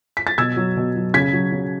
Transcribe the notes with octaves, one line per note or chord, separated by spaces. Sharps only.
B6
A6
B2 E6 G#6
F#3
B2
F#3
C#3 G#6 B6
F#3
C#3